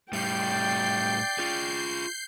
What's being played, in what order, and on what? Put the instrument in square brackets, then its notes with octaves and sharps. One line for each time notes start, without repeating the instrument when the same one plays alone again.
[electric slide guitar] A2 G3 [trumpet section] D5 [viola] G5 [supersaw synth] G6 C7
[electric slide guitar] F4 G#4